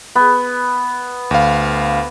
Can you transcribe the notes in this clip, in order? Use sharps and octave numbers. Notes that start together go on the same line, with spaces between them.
B3
D2 F5